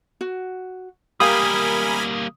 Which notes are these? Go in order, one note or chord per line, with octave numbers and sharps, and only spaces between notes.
F#4
G3 A#3 G4 A#4 F5 G#5 B5 D#6